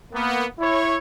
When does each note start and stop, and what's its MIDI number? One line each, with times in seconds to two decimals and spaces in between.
0.13 0.44 58
0.13 0.44 59
0.59 0.97 64
0.59 0.97 73